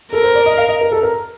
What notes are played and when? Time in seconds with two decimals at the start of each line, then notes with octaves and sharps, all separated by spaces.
0.13 A4 A#4
0.24 C5
0.35 D5
0.46 D#5
0.57 F5
0.69 D#5
0.81 A#4
0.92 A4
1.03 A#4